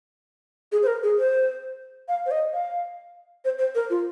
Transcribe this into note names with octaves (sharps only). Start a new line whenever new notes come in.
G#4
C5
A#4
G#4
C5
F5
C5
D#5
F5
C5
C5
A#4
F4